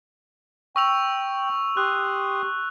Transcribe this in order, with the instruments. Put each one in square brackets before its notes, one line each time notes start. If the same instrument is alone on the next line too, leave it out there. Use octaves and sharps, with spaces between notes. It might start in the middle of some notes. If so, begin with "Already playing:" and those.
[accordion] G5 [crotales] C#6 E6 F7
[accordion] G4 C6 D#6 [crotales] F#6